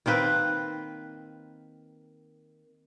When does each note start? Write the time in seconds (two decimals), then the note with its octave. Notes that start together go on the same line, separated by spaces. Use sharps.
0.06 D#3 A#3 C4 B4